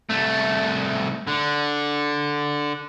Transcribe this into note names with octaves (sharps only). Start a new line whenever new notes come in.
C2 A3
D3